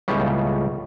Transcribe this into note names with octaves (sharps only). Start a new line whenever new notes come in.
C#2 A2 C#3 G3 B3